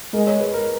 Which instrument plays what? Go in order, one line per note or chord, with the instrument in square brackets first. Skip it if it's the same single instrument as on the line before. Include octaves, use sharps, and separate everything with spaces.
[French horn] G#3 [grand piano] A#4
[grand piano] C#5
B4
A#4